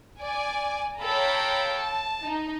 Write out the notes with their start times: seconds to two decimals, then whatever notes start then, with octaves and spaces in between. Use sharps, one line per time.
0.22 D5 G#5
1.02 A4 C#5 F5 G5 A#5 B5
1.80 A5
2.22 D#4